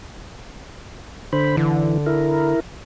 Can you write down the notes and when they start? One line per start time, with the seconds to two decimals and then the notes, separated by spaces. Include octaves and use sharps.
1.33 D3 C5 B5
1.57 D3 E3
2.06 E4 A#4